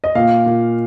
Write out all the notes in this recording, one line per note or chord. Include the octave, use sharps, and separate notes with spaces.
D#5
A#2 F5
A#2